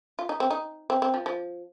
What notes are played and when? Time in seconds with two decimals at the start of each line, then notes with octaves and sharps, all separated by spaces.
0.19 F4
0.29 D#4
0.40 C4
0.51 D#4
0.90 C4
1.02 C4
1.14 F3
1.26 F3